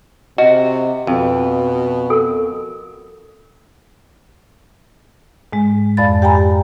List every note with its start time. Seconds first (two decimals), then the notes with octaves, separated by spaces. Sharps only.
0.38 C3 F#4 D#5
1.07 F2 B2
2.10 A4 A#4
5.53 G#2 G#3
5.97 F2 D5 F5 B5 A6
6.22 G4 G5 G#5 A#5 B5